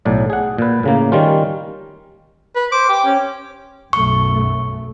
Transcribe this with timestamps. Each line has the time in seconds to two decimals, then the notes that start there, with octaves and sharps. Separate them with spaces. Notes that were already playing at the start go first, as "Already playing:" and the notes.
0.05 B1 A2 D5
0.30 G#4 F#5
0.58 A#2 B4
0.83 A2 C#3 A#3
1.12 D#3 G3 C#4 F4
2.56 B4
2.72 C5 D6
2.89 G4
3.05 C#4
3.93 B1 F#2 A3 C#6